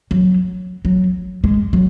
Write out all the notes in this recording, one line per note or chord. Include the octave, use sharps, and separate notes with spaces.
F#3
F#3
G#3
F#3